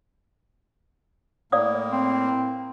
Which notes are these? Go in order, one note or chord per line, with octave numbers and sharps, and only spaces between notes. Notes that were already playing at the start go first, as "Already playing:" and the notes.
A2 A#3 D5 F5 D#6
C4